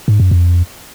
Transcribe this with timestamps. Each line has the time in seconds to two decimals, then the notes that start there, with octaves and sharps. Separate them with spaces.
0.08 G#2
0.20 F#2
0.31 F2